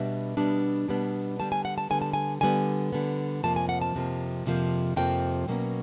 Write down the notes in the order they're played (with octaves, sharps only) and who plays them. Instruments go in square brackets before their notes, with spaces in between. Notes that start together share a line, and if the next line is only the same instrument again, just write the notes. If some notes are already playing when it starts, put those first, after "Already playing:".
Already playing: [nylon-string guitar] B2 G3 B3 D4 E5
B2 G3 B3 D4
B2 G3 B3 D4
D3 G3 B3 A5
G#5
F#5
A5
D3 G3 B3 G#5
A5
G#5
D3 G3 B3 G#5
D3 G3 B3
F2 C3 F3 A#3 A5
G#5
F#5
A5
F2 C3 F3 A#3
F2 C3 F3 A#3
F2 C3 F3 A#3 G5
B2 F#3 A#3 C#4